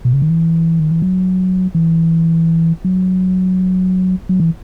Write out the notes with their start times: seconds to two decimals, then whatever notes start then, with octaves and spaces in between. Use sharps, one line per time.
0.05 B2
0.13 C#3
0.22 D#3
0.30 E3
0.80 D#3
0.91 E3
1.02 F#3
1.75 E3
2.84 F#3
4.29 F#3
4.40 E3